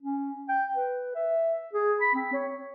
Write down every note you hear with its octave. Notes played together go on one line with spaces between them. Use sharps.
C#4
G5
B4
E5
G#4
B5
C4
C#5